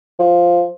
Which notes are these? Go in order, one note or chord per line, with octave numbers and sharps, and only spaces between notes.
F3